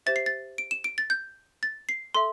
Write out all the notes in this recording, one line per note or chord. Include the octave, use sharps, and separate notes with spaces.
G4 C5 E5 A6
C7
A6
D7
E7
D7
A6
G6
A6
C7
A4 E5 C6